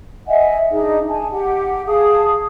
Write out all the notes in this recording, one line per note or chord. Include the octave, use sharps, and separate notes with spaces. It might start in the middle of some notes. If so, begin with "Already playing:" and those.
D#5 E5 F#5 G#5
D4 D#4 G#4 D#5
G#5 A5
G4 F#5
G#4 F5 A5 D#6